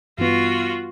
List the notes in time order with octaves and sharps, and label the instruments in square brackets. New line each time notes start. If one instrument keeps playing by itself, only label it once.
[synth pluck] G2 E3 B3 [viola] F4 F#4